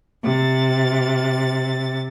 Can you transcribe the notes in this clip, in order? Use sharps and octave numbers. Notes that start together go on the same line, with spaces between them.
C3 A6